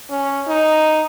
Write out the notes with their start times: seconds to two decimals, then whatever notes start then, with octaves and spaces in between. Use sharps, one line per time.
0.11 C#4
0.48 D#4